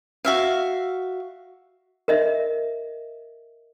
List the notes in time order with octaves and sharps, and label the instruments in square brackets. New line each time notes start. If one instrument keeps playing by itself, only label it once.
[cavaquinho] F#4 E5 F5
[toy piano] A#4 D#5 E5